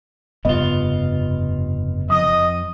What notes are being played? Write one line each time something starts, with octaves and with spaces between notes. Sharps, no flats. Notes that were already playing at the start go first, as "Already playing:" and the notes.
F1 G2 C#3 B3 F4 D#5
F2 D#5 D#6